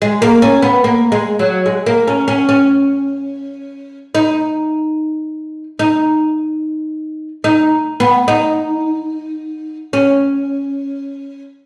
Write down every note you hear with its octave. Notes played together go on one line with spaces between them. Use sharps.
G#3
A#3
C#4
B3
A#3
G#3
F#3
G#3
A#3
C#4
C#4
C#4
D#4
D#4
D#4
B3
D#4
C#4